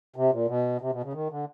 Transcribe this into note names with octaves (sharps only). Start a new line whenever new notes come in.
C3
A#2
B2
C3
B2
C#3
D#3
D3